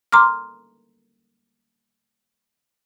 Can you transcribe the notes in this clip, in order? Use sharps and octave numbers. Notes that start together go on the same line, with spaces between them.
A#5 C6 D6 F6